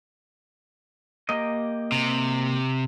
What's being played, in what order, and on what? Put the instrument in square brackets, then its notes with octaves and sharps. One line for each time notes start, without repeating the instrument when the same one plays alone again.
[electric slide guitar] A#3 G4 D#5
[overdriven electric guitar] C3